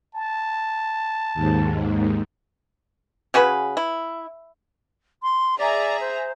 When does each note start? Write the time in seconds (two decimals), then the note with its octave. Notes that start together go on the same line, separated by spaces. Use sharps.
0.15 A5
1.34 D#2 G#2
3.34 C#3 F#4 G#4 B4
3.77 E4
5.23 C6
5.59 G#4 D5 E5 A#5
6.01 C5